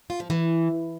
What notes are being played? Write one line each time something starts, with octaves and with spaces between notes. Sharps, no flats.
F4
F3
E3